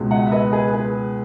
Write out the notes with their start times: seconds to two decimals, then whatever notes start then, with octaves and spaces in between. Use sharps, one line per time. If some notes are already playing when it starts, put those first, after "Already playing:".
Already playing: C#2 B2 G#3
0.11 D#5 F#5
0.27 E5
0.32 B4 D#5
0.53 G#4 B4
0.74 G#4 B4